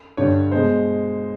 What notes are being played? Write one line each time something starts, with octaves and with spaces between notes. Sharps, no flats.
G2 D3 G3 C#5
B2 G#3 C5